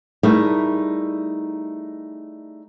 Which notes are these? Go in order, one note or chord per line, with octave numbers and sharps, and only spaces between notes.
G3 A3 D#4 E4 G#4 A#4